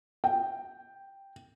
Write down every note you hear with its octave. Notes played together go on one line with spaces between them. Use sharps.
G5